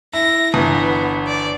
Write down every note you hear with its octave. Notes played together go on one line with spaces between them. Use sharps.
E4 A#6
G1 E3 B3
D5